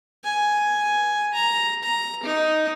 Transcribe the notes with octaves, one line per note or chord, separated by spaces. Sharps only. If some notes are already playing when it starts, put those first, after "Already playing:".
G#5
A#5
A#5
D#4